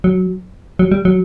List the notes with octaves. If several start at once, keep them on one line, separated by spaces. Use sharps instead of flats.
F#3
F#3
G3
F#3